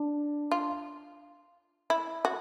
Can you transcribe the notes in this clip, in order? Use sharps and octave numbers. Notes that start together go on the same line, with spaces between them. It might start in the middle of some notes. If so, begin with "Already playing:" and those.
Already playing: D4
F4
E4
F#4